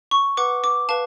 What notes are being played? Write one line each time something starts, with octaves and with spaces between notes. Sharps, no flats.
C#6
B4 F#5 D6
D6
B4 F5 A5